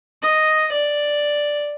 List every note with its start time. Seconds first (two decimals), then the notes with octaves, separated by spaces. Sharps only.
0.23 D#5
0.72 D5